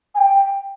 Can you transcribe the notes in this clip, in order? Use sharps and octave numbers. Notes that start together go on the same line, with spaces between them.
G#5
G5